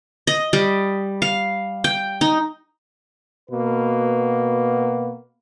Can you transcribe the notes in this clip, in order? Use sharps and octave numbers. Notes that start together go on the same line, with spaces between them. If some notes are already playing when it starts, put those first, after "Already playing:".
D#5
G3
F5
G5
D#4
B2 A#3 F#4 B4